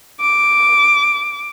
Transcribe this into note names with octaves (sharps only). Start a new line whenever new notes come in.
D6